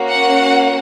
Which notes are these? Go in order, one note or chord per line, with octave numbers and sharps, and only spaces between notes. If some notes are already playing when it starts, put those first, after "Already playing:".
Already playing: A#3 C#4 F#4
F#5